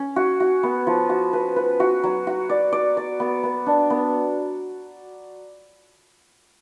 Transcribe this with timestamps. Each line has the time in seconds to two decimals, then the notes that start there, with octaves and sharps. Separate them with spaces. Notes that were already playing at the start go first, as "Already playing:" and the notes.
Already playing: C#4
0.16 F#4
0.40 F#4
0.63 B3
0.87 F3
1.09 F#4
1.33 B4
1.56 B4
1.80 F#4
2.04 F#3
2.27 F#4
2.49 D5
2.72 D5
2.97 D5
3.20 B3
3.43 B3
3.66 D4
3.90 B3